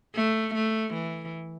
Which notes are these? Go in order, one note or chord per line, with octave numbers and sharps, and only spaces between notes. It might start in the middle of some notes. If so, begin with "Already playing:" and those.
A3
A3
E3